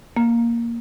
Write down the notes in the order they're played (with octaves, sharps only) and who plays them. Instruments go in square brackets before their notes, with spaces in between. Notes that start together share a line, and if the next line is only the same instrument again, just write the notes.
[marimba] A#3